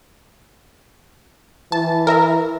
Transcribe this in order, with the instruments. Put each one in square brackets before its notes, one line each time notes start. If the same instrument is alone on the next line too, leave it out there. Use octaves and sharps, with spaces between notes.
[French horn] E3 [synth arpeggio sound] A5
[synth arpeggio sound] A#4 E5 A#5